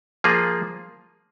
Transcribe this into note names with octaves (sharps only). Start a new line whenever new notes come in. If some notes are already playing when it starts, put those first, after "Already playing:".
F3 A#3 F4 G#4